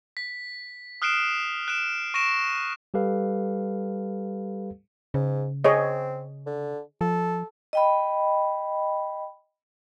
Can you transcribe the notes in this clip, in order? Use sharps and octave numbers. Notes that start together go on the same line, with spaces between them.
B6
D#6 F6 F#6 C7 D7 E7
F#6 D7 E7
C#6 A#6 D7 E7
G3 G4 A4 B4 F5
G#2 C#3
C4 G#4 C#5 D#5
D3
F3 A4
D#5 G5 B5